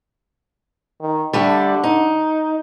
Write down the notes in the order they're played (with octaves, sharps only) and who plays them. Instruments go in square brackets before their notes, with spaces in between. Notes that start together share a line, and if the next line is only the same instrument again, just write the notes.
[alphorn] D#3
[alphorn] D3 [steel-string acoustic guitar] G3 A3 D4
[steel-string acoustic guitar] D#4